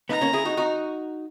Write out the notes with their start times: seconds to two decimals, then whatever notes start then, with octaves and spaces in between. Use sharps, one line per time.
0.09 B3 D#4 A#5
0.21 A#3 C#4
0.33 E4 G#4
0.45 D#4 F#4
0.57 D#4 F#4